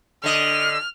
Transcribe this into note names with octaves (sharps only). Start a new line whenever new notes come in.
D3 D#5 F6